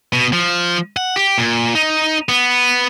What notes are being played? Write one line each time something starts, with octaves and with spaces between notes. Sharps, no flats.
B2
F3
F#5
G4
A#2
D#4
B3